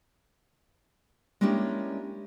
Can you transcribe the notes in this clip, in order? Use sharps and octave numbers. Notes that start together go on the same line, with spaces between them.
G#3 A#3 C#4 D4 E4 G4